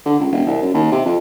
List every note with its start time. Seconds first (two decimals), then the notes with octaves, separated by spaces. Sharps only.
0.06 D3
0.19 C#2
0.32 E1
0.47 C2
0.62 F#2
0.74 D#2
0.92 C3
1.05 F2